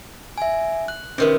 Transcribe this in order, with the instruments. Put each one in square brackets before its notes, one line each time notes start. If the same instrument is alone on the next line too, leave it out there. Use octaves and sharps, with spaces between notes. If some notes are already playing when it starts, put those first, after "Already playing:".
[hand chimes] E5 G#5
F#6
[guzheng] C3 D#3 B3 [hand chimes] C#4